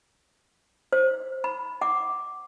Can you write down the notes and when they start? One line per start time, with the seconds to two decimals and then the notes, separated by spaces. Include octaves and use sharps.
0.93 C5
1.44 B5
1.81 F#5 D6